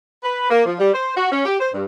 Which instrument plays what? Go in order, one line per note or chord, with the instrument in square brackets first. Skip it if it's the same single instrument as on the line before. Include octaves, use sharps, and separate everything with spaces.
[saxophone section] B4
A#3
F3
G3
C5
F#4
C#4
G4
C5
G2